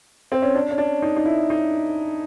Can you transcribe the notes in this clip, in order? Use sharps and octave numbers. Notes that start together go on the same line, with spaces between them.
C4
C#4
D4
C#4
D4
D#4
D#4
E4
D#4